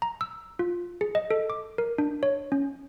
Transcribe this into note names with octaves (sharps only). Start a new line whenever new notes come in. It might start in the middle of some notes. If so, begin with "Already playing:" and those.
A#5
E6
F4
G#4
D#5
A4
D6
A#4
D4
C#5
C#4